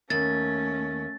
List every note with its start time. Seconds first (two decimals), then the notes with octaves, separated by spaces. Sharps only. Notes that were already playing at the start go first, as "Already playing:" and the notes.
0.10 D#2 A3 C#4 A6